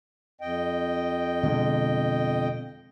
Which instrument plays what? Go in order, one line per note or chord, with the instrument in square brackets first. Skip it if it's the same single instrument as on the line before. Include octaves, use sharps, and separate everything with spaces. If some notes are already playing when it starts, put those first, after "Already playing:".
[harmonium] F2 D#5 G5
[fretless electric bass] B2 D3 G#3